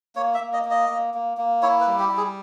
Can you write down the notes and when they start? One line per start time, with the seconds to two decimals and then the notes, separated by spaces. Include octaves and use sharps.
0.16 A#3 C#5
0.34 E5
0.40 A#3
0.53 D#5
0.65 A#3
0.71 D#5
0.89 A#3
1.14 A#3
1.37 A#3
1.62 E4 C#5
1.81 B4
1.87 G3
1.99 G4
2.12 G3
2.17 G#4